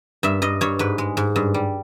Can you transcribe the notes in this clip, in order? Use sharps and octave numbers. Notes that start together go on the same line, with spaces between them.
G2 E5
G2 D#5
G2 C#5
G#2 B4
G#3
G#2
G2
G3